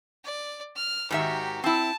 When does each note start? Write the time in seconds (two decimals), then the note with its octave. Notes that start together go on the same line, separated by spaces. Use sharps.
0.24 D5
0.76 F6
1.11 G#2 D#3 F#4 G4 E5
1.64 C4 E4 A5